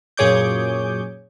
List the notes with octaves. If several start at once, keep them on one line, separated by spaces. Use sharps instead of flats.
F#2 A#2 G#4 C#5 D6 G6